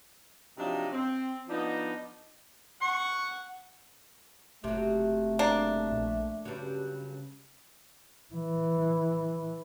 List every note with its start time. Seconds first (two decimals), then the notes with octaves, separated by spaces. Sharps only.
0.58 C3 F3 F#3 D4 D#4 D#5
0.92 C4
1.49 F3 B3 D4 D#4
2.81 F#5 C#6
4.64 F#1 C3 F#3 A3
5.39 A#3 D4
5.91 A#1
6.45 G2 C#3 F#3
8.34 E3